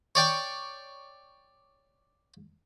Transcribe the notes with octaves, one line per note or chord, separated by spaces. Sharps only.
C#5 D5 G5 C#6